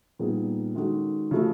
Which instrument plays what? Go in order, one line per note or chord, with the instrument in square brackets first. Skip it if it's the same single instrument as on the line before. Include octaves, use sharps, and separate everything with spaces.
[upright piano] A#2 G3 B3 D#4 G#4
D#3 G#3 C#4 F#4 A4
C#3 F3 A3